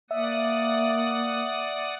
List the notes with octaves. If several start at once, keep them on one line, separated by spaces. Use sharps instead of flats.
A#3 D5 E5 F#5 D#6